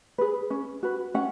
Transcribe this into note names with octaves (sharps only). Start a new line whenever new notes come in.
G#4 B4
C#4
F#4 B4
C#4 F#5